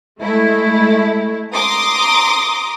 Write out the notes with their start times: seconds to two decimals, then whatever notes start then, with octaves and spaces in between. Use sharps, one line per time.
0.21 G#3 A3 E4
1.55 A#5 C6 D6 D#6